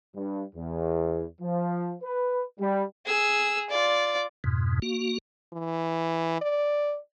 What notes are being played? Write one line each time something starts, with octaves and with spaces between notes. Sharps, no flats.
G2
E2
F3
B4
G3
G#4 E6
F4 D5
F2 G#2 B2
A#3 F#4
E3
D5